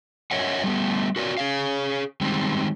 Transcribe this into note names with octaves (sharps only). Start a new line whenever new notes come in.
A#4 C#5 D#5 E5 F#5
G3 A3 B3
F#4 A#4 C#5 D5
G#4 C#5 F5
D#3 G3 G#3 C4